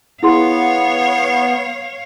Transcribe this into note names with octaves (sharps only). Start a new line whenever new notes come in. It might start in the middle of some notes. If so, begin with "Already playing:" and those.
B3 E4 G#4 C#5 F5 C6